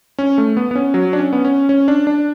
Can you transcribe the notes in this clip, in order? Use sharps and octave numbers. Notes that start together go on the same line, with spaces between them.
C#4
A3
B3
B3
C#4
F#3
D4
C#4
B3
C#4
C#4
D4
D4